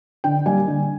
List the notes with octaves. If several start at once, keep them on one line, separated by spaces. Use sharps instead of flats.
D3 G5
G3 A#3 G#5
D3